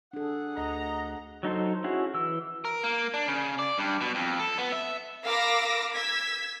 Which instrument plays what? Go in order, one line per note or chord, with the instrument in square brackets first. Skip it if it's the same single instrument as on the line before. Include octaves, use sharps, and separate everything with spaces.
[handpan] D4 A4 [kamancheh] G#4 F#5
[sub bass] D2 [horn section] D#5 A#5
[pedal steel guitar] F#3 D#4 A4 C5
C#4 E4 F#4 G#4
E3 E6
[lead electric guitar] A#4
A#3
D4
C#3
D5
G2
B2
F2
A4
B3
E5
[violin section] A#4 F5 B5 D6 E6 A#6
E6 G#6 B6